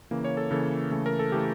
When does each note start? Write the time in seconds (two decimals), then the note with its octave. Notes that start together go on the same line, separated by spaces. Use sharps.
0.11 C#3 E3 A#3
0.25 C#5
0.37 A4
0.51 C#3 E3 A#3 A4
0.91 C#3 E3 A3
1.06 A#4
1.19 A4
1.32 C#3 E3 A3 G4